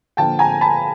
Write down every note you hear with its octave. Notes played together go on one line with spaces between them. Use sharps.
D3 F3 A#3 G5 A5
G#5 A#5
A5 B5